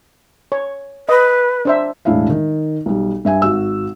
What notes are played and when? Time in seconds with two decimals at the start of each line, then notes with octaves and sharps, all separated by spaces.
0.52 C#5
1.09 B4 D#5
1.65 D4 C5 E5
2.05 E1 A2 D4 E4 E5 F5
2.30 D#3
2.86 B1 G3
3.25 G2 E5 G#5
3.42 G#1 F#4 E6